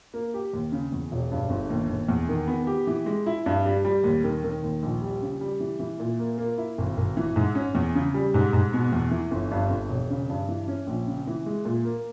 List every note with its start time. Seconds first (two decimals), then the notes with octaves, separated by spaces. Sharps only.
0.14 A#3
0.34 G4
0.53 D#2
0.72 C#3
0.92 E2
1.12 E1
1.32 G2
1.50 G1
1.70 D#2
1.90 D#2
2.09 E2
2.29 D#3
2.48 B3
2.67 G4
2.87 E3
3.06 G#3
3.26 E4
3.46 G2
3.66 G3
3.85 G3
4.04 D#2
4.24 D#3
4.44 D#3
4.63 D#2
4.83 A#1
5.02 G3
5.22 C#3
5.41 G3
5.60 E3
5.80 E3
6.00 A#2
6.20 A#3
6.38 A#3
6.58 E4
6.78 G#1
6.97 G#1
7.17 E3
7.36 G#2
7.55 C#4
7.75 E2
7.95 C#3
8.14 G3
8.34 G#2
8.53 G#2
8.73 B2
8.92 E2
9.11 E3
9.31 G1
9.51 G2
9.70 G1
9.89 E1
10.10 C#3
10.30 G2
10.49 E3
10.68 C#4
10.87 A#1
11.07 C#3
11.27 E3
11.46 G#3
11.65 A#2
11.85 A#3